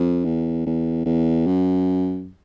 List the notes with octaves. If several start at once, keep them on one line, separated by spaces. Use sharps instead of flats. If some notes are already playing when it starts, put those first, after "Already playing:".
Already playing: F2
E2
E2
E2
F#2